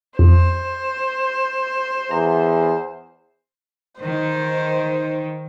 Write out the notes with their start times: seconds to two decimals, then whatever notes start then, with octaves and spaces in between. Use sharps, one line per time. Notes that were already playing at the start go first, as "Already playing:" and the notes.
0.19 F2 C5
2.11 E2 A#5
4.00 D#3 C5